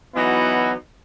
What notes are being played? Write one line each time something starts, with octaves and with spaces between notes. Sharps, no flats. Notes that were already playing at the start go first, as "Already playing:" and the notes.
E3 F#3 B3 D#4 E4 F#4